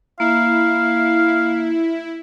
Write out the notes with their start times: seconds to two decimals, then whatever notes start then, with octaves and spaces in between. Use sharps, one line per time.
0.20 A#3 E4 F5